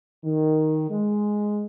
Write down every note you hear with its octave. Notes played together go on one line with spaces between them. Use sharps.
D#3
G#3